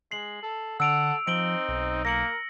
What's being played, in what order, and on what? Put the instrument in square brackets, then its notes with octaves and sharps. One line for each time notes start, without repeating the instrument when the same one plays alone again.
[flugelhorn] G#3 [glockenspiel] C7 F#7
[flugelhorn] A4
[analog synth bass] D3 [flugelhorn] A4 [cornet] F#5 [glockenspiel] E6 D7 F7
[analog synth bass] F3 [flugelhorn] C4 [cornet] D#4 [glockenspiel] D7 F#7 G7
[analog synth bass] B1
[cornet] A#3 [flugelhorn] A#4 [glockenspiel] A#6 C#7 F#7